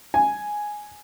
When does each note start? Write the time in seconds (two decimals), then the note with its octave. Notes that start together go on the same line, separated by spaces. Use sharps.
0.14 G#5